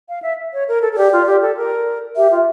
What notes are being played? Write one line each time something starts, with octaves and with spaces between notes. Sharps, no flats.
F5
E5
C#5
A#4
A4
A4
G4 D5
F4
G4
A4
A#4
G4 E5
F4